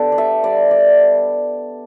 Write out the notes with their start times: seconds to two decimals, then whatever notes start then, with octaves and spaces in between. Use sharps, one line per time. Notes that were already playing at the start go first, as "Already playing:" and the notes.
Already playing: B3 D4 G4 A4
0.12 D5
0.18 G3 E5
0.44 G3 D5
0.71 G3 D5